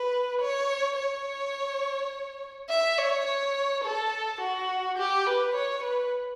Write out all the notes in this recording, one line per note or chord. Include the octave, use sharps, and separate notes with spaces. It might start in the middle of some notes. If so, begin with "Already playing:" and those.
Already playing: B4
C#5
C#5
E5
C#5
C#5
A4
F#4
G4
B4
C#5
B4